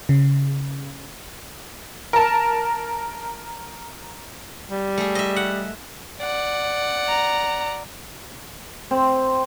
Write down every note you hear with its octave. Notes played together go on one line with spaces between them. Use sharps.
C#3
A#4 A5
G3
A3 G#4
D#5 E5
F#5
D5 F#5
A#5
C4